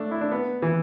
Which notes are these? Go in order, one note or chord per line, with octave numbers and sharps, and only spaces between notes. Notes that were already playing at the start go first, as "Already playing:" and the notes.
Already playing: A3 D4
E4
D4
B3
E3